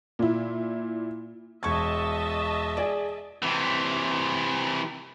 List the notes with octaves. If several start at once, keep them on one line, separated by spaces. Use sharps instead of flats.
A#2 E4
E1 D#5 E5 A5 C#6 G#6
G#4 D5
C3 E3